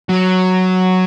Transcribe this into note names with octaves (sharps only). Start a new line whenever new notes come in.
F#3